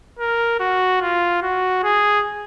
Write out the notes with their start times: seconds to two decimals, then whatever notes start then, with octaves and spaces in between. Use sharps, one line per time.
0.19 A#4
0.60 F#4
1.01 F4
1.43 F#4
1.83 G#4